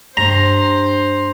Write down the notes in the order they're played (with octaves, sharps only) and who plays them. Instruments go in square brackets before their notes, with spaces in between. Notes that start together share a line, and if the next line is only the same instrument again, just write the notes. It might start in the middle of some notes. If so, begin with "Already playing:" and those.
[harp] G2 [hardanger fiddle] C5 [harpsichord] A#5